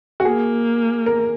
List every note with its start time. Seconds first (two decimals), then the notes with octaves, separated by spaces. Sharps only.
0.20 F#4
0.25 A#3 G#4
1.06 A#4